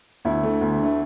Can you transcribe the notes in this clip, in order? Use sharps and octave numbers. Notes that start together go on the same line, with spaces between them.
D2 E4
D3 A3
D2
D3 A3